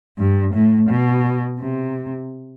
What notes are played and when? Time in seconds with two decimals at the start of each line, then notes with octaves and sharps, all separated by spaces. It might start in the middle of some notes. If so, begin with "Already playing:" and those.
0.18 G2
0.53 A2
0.89 B2
1.60 C3